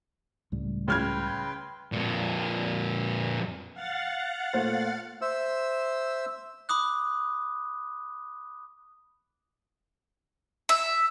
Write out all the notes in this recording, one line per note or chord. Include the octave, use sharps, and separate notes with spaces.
C#2 A2 G3
C#3 B4 G5 C6 F6 G#6
F2 A#2
F5 F#5 A6
A#2 A3 C5
C5 E5 E6
B5 D6 D#6 F#6
E5